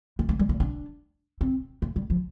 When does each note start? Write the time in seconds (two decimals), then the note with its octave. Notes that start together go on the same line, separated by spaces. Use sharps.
0.19 A#3
0.29 A3
0.39 G3
0.49 A#3
0.60 D4
1.41 C4
1.82 A#3
1.96 G3
2.10 F3